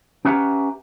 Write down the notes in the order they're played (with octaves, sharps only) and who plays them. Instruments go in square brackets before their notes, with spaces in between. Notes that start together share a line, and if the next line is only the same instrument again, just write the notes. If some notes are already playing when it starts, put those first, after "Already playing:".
[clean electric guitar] C#4 G4 B4 E5 F#5 A#5